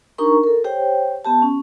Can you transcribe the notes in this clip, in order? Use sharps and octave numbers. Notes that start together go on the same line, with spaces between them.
D4 D#4 G4 A#4 A#5 C#6
A4 A#4
G4 C5 C#5 G5
B3 G4 A5
C#4